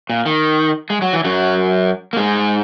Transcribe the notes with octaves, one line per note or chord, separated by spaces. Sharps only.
A#2
D#3
G#3
F#3
E3
F#2 F#3
A#3
G#2 G#3